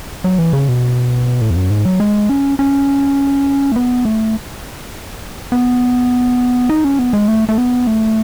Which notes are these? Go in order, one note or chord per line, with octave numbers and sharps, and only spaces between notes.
F#3
E3
C#3
B2
A2
E2
F#2
G#2
F#3
G#3
C#4
C#4
A3
B3
A3
B3
D#4
C#4
B3
G#3
A3
A3
B3
A3